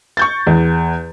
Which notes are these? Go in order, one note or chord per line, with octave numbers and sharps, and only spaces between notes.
C#6 G6 A6
E2